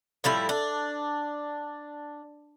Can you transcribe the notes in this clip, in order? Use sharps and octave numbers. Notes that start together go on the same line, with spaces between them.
A2 F3 G3 E4
D4